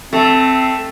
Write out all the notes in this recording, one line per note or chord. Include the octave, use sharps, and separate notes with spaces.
A3 C4